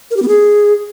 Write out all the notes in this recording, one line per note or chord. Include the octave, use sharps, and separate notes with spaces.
A#4
G4
B3
G#4